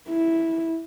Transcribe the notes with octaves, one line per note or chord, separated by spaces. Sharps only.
E4